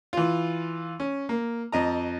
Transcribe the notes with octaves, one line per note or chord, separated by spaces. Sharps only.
E3 F4
C#4
A#3
F2 D#5 A#5